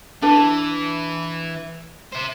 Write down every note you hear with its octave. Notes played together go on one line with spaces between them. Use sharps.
E3 D4 B4
C5 E5